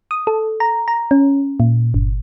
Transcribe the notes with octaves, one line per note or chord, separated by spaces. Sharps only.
D#6
A4
A#5
A#5
C#4
A#2
G1